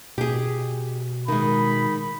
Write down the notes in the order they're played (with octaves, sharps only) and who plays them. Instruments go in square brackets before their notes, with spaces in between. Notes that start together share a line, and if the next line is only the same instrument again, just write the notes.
[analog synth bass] B2 [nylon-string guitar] G4 G#4
[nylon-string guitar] D#3 G#3 [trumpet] B5